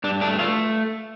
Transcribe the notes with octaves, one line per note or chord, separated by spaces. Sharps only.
G2 D4
A3 D4
A3 F4